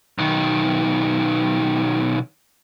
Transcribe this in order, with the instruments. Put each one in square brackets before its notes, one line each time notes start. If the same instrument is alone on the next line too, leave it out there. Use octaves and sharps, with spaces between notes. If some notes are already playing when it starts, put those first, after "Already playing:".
[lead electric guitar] B1 D#3